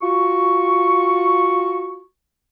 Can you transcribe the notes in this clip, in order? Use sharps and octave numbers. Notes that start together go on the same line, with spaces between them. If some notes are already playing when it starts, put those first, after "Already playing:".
F4 F#4 C#6